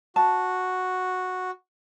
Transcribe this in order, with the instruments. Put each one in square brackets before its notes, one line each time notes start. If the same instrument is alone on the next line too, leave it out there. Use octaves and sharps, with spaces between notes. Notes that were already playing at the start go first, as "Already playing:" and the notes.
[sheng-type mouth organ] F#4 [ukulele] A5